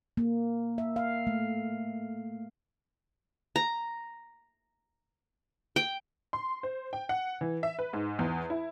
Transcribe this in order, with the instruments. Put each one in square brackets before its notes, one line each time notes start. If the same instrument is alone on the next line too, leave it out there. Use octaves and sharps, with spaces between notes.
[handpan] A#3
E5
F5
A3
[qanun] A#5
G5
[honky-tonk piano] C6
C5
G5
F#5
E3
E5
B4
G#2
E2
E4